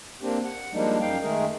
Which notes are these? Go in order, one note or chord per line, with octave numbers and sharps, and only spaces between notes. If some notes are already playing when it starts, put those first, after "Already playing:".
A#3 C4 D4 G4
F#5
F3 G3 G#3 A#3 D4 D#4
F#2 D#4 F5 G5
D#3 G#3 A3 G#4 A#4